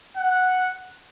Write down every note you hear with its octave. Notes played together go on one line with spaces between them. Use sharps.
F#5